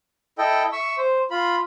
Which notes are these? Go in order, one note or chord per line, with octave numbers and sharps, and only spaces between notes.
E4 A4 D#5 G5
E5 C#6 E6
C5
F4 B5